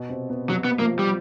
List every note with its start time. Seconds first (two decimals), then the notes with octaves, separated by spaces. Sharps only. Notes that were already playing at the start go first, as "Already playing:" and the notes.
Already playing: B2 B3
0.09 C3 C4
0.29 B2 B3
0.50 C3 F#3 C4
0.64 B3
0.79 F3 A#3 F4
0.99 G3